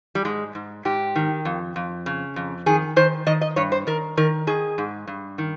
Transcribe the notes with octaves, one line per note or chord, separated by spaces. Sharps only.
G3
G#2 G#3
G#2
G#2 G4
D#3
F2
F2
C#3
F2
D#3 G#4
D#3 C5
D#3 D#5
D#5
G2 C#5
C5
D#3 A#4
D#3 A#4
D#3 G#4
G#2
G2
D#3